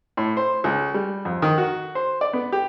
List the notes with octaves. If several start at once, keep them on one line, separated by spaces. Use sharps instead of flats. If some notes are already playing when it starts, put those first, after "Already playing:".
A2
C5
C#2
G3
F2
D#3
F#4
C5
D5
B3
G4